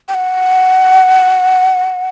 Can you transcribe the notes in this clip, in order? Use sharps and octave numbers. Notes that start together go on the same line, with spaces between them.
G5
F#5